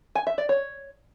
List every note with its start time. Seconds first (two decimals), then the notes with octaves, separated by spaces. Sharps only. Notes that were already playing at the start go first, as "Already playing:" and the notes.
0.15 G#5
0.27 E5
0.38 D5
0.49 C#5